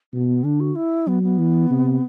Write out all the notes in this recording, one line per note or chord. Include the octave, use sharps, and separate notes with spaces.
B2 B3
B3
D3 D4
F#4
E4
F#3 B3
B3
E3
C3